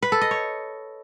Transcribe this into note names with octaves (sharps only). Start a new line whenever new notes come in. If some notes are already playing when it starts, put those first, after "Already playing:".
B4
A4
D#5
C#5